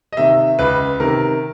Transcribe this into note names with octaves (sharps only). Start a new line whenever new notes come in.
D#5
C3 D#3 E5
C#2 B4
C3 D#3 A#4